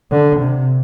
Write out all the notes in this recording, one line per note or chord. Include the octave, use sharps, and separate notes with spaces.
D3
C3